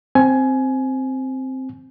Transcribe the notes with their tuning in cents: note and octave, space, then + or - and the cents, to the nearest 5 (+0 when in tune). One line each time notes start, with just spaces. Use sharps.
C4 +0 G#5 +20